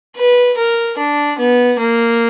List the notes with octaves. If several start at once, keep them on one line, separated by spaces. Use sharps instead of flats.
B4
A#4
D4
B3
A#3